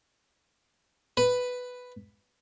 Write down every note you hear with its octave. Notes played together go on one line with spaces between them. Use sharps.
B4